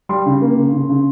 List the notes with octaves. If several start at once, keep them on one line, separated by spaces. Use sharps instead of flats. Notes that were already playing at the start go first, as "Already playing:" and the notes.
G3 C6
C#3
A#3
C#3
C#3
C#3